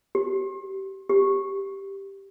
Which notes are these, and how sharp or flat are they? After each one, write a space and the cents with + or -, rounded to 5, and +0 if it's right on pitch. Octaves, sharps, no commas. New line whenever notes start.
G4 -30
G4 +0